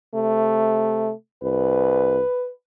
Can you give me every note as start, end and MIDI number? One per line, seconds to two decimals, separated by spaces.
0.15 1.11 48
0.15 1.13 57
1.43 2.21 36
1.43 2.50 71